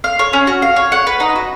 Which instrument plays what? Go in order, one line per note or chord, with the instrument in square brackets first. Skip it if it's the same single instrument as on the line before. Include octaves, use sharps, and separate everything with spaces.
[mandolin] F5
C#5
C#4
F#4
F5
C#5
F#5
B4
D#4
F#4